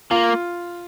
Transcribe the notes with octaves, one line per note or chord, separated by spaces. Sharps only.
A#3 F4